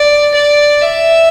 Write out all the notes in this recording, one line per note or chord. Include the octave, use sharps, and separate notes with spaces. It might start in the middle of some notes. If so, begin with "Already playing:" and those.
Already playing: D5
D5
E5